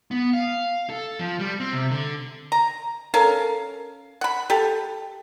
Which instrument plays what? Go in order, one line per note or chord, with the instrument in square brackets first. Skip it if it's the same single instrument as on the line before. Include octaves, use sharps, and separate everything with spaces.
[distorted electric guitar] B3
F5
A4
F3
G3
C4
C3
D3
[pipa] A#5
C#4 A4 A#4 F5
F#5 B5
G4 A4